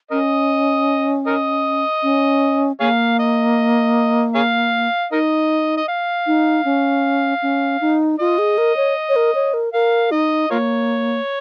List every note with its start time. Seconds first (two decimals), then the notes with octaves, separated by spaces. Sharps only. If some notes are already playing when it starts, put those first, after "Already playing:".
0.11 C#4 A#4 D#5
1.27 A#4 D#5
2.03 C#4
2.80 A#3 G#4 C#5 F5
3.19 D#5
4.35 G#4 C#5 F5
5.11 D#4 A#4 D#5
5.77 D#5
5.88 F5
6.27 D#4
6.65 C#4
7.42 C#4
7.81 D#4
8.20 F4 D#5
8.38 G#4
8.58 A#4
8.77 C#5
9.09 C#5
9.16 A#4
9.35 C#5
9.54 A#4
9.73 A#4 F5
10.11 D#4 D#5
10.50 A#3 F4 A#4 C#5